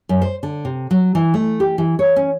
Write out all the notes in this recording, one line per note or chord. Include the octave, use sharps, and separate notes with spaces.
F#2
C5
D3
C3
F#3
E3
A3
G4
E3
C#5
C#4